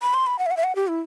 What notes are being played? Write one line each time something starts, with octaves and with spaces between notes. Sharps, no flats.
B5
C6
B5
F#5
E5
F#5
E5
F#5
G4
E4